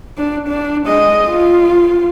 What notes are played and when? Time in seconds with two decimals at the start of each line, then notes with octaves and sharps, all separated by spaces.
0.17 D4
0.48 D4
0.86 G#3 D#5
1.30 F4